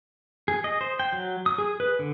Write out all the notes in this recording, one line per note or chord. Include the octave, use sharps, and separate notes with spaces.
G#4
D#5
C5
G5
F#3
D#6
G#4
B4
D3